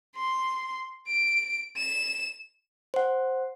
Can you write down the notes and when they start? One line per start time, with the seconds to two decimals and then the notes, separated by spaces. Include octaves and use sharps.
0.15 C6
1.08 D7
1.77 E7
2.94 C5 F#5